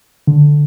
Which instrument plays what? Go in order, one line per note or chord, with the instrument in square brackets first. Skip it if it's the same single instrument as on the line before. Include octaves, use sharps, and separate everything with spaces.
[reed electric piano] D3